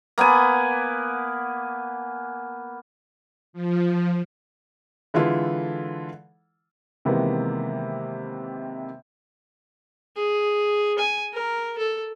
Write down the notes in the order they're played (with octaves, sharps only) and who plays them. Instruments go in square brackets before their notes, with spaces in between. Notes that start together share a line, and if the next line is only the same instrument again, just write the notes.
[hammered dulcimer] A#3 B3 F#5 G#5
[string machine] F3
[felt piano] D3 E3 G#3 E4 F4 A4
[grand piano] C3 D#3 E3 G#3 A#3 B3
[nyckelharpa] G#4
G#5
A#4
A4